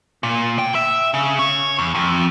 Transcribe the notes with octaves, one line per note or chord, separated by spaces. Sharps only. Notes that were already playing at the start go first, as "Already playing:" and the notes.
A#2
G5
E5
C#3
C#5
E2
F2